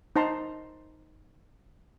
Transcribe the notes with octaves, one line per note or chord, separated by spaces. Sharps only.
D#4 C5 A5 A#5 C6